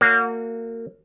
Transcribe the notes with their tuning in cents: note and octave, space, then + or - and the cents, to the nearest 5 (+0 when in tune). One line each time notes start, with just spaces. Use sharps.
A#3 -30 F#4 -35 C#5 +45